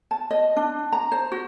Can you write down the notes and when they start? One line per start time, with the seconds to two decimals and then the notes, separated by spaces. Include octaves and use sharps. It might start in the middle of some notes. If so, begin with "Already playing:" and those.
0.11 A5
0.31 D#5
0.56 D4
0.92 A#5
1.12 C5
1.32 F#4